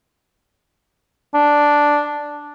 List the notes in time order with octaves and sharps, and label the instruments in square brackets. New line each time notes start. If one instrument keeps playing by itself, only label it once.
[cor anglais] D4